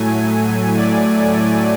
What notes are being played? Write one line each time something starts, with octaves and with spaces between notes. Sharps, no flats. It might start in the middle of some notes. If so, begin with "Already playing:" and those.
Already playing: A2 F#3 A3 G#5
D5